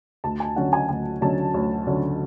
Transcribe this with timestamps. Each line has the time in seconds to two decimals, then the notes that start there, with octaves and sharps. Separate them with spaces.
0.24 D2 A5
0.40 G#5
0.56 D3 F#3 C#4 F#5
0.73 G#5
0.82 A5
0.89 D2 G#5
1.21 D3 F#3 C#4 A5
1.54 D2 C#5
1.87 D3 F#3 C#4